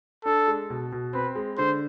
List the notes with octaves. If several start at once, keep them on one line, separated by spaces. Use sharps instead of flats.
D4 A4
G#3
B2
B2
C4 B4
G#3
D3 C5